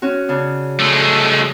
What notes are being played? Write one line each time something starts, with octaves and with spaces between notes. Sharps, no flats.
C#4 F#4
C#3 D4
G#3 A3